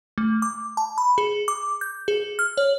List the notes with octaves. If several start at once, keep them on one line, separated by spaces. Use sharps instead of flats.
A3
D6
A5
B5
G#4
D6
G6
G#4
F6
C#5